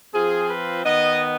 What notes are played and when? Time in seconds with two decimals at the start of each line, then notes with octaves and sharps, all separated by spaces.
0.12 F3 C4 F4 G#4
0.49 B4
0.85 D#3 B3 D#4 D#5